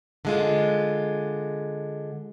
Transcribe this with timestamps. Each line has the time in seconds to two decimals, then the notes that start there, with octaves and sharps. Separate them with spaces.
0.25 D3 G#3 F4